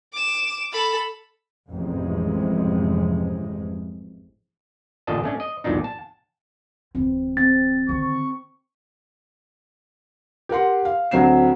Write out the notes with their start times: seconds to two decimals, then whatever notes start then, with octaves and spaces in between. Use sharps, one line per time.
0.13 D6 E7
0.72 A4 B5
1.70 A1 F2 G#2 C3 E3 G#3
5.07 A1 A#2 D3 D4 D#5 A5
5.24 A3 C#4 D4
5.40 D#5
5.64 B1 E2 A#2 D4 D#4
5.84 A5
6.95 D1 E3 C4
7.37 C4 A6
7.89 D3 D#3 C#6
10.49 G4 A#4 F#5 C6
10.85 F5
11.11 D2 F#3 C4 C7 E7